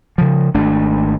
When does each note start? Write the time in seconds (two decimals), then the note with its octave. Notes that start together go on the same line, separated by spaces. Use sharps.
0.18 C#3 F3
0.54 G#1 A3 D4